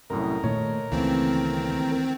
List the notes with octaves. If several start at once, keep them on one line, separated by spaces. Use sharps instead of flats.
C2 F#2 A2 A#4
A#2 D#3 A3 D#4 C#5
C#2 D#3 E3 A3 A#3 C4